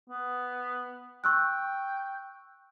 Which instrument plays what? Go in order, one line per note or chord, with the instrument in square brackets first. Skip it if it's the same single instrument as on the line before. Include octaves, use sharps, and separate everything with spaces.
[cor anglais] B3
[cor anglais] G5 [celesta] C#6 E6 F#6